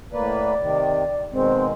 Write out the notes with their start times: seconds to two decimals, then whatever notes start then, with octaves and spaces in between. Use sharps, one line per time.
0.12 A2 A#3 B4 D5
0.60 C3 D#3
1.32 B2 D#3 G#3 C4